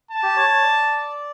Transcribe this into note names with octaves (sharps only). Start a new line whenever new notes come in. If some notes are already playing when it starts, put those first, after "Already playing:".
A5
G4
C#5
C#5
D5